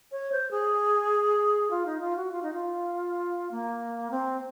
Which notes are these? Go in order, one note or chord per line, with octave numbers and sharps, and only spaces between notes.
C#5
C5
G#4
F4
D#4
F4
F#4
F4
D#4
F4
A#3
C4